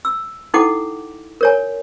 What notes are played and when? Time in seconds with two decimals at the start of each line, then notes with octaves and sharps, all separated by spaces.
0.05 E6
0.54 D#4 E4 A4 F#5 G5 D6
1.41 A#4 C#5 G#5